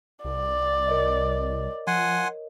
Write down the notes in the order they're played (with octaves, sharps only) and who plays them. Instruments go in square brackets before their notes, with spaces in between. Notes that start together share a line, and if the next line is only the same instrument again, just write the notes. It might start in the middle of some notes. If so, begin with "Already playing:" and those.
[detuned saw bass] C2 [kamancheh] D5
[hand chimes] A#4 C#5 D#5
[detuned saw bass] F3 [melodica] F#5 G#5 C6